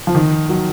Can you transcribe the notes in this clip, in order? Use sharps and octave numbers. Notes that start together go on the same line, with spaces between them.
F3
D#3
F#3